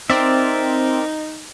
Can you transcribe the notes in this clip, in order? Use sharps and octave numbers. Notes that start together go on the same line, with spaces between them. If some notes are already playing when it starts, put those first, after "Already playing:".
C4 D#4 A#4 D5 E5